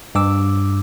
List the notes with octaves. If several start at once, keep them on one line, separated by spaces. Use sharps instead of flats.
G2 D6 E6